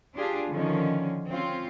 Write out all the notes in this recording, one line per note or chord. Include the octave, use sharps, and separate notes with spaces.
D4 F4 G4 G#4
D3 D#3 F3 C#4
C4 C#4 F4